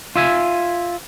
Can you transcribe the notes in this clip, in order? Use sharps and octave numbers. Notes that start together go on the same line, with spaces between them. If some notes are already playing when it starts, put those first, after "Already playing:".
F4 E5 G#5